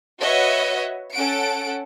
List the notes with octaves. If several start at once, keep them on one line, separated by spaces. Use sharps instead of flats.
F#4 B4 C#5 D#5 E5 F#5
C#4 A4 F#5 D7